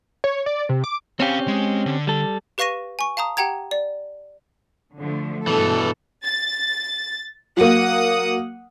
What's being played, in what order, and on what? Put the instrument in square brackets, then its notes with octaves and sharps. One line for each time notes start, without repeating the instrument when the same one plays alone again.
[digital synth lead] C#5
D5
C3
D6
[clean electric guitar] C4 C#4 G4 [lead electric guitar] C#5 F5
[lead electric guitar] G#3
D3
[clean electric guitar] G3 A4
[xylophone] G4 B4 F5 C#6 A#6 D#7
G#5 C#6
F5 A5 A#5 D#6
G4 F#5 G5 A#5 G#6
D5
[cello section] D3 F3 A3
[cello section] G2 A4 [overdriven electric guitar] B2 E3
[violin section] A6
[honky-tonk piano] F#3 A#3 [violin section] F#5 D#6